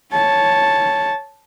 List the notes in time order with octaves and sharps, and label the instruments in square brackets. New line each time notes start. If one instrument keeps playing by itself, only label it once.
[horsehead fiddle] C#5 A5